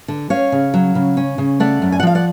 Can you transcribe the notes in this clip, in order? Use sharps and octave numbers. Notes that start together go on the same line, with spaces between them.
D3
C#4 C#5 F5
C#3
F#3
C#3
C#4
C#3
A3 D5 F#5
F#2
G#5
F#5
F3 F5
D5 F#5